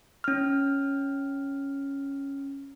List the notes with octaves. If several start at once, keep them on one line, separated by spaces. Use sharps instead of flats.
C#4 F6